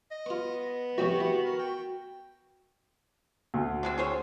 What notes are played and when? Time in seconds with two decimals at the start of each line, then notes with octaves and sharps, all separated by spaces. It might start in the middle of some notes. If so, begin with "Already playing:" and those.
0.11 D#5
0.26 B3 F4 C#6
0.98 C2 F2 A2 F#4 G4
1.21 E3
1.45 A#4
1.59 G5
3.54 D2
3.83 D3 G#3 C4
3.98 G#4 C5 C#5